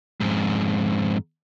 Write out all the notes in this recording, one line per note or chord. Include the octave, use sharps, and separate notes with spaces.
F2 G#2